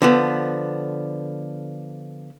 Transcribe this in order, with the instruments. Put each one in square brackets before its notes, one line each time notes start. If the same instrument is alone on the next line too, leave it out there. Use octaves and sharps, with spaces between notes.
[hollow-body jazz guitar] D3 F3 B3